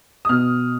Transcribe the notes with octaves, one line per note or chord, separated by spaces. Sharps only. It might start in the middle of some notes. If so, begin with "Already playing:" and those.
D#6
B2 F6